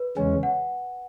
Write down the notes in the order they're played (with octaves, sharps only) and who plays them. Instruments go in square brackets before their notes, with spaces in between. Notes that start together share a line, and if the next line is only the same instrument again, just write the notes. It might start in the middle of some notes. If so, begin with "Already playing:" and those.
Already playing: [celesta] B4
[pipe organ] E2 C#3 G#3 C#4 [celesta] G#5
[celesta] F#5